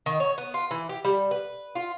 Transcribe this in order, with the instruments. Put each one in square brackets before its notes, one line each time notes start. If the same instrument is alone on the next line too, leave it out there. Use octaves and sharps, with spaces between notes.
[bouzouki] D#3
C#5
B3
F4
E3
G4
G3
B4
F4